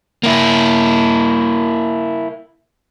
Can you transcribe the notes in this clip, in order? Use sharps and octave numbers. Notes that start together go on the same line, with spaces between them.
A#3 E4